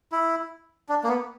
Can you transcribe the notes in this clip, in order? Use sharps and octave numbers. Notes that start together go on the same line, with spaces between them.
E4
D4
A#3
B3